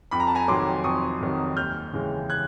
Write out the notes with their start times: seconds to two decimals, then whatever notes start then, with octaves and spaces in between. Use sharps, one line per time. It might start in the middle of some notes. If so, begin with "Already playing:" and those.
0.11 F2 B5
0.20 A#5
0.27 A5
0.35 G#5 A#5
0.48 C3 D#3 F#3 C6 D6
0.84 F2 C#6 D#6
1.21 C3 D#3 F#3
1.56 D#2 F6 G6
1.93 C#3 E3 G#3
2.30 F#6 G#6